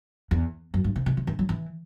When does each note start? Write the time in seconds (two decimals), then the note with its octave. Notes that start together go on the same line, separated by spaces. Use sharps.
0.31 E2
0.74 F#2
0.84 G2
0.96 C3
1.06 C3
1.17 E3
1.27 E3
1.39 F#3
1.49 E3